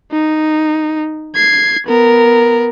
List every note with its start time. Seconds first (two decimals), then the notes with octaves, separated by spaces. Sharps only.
0.12 D#4
1.35 G#6 C7
1.87 B3 A#4